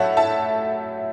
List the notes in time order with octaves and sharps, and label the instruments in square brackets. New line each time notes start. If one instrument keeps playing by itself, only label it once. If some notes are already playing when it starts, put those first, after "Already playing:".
Already playing: [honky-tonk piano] A2 F#3 A3 C#5 E5 F#5 A5
E5 A5